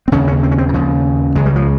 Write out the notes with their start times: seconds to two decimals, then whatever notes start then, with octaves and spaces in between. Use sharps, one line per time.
0.08 C4
0.12 D#2 C#3 C#4
0.28 C#4
0.43 C4
0.51 C#4
0.58 C4
0.69 D#3
0.74 D#2 C#3 F3
1.35 C#2 C#3 G#3
1.46 G3
1.56 F3